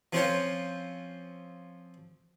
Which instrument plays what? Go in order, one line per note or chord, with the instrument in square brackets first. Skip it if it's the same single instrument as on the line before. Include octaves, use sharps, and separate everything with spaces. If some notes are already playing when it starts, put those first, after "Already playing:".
[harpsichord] F3 C4 C#4 F4 C5 C#5